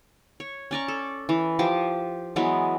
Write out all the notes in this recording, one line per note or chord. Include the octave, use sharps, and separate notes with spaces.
C#5
C#4 D5 A#5 C#6
A4
E3
F3 G4 D6
E3 F#3 G#3 B3